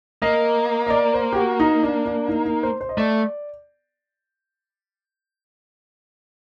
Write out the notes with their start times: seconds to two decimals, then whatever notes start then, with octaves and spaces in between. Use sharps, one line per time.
0.22 A#3 D#5
0.87 D#5
0.90 D5
1.14 C5
1.33 G4
1.36 F#4
1.60 D#4
1.83 D4
2.06 D4
2.28 D#4
2.45 D#4
2.63 C5
2.81 C5
2.89 D#5
2.97 A3 D5